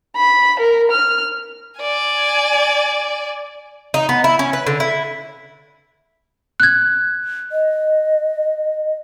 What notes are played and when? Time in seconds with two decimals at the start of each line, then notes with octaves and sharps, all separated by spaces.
0.17 B5
0.60 A#4
0.91 F6
1.80 D5 G#5
3.94 D#4
4.09 B3
4.24 E4
4.39 C#4
4.53 B4
4.67 D3
4.80 E4
6.60 F#6 G#6
7.52 D#5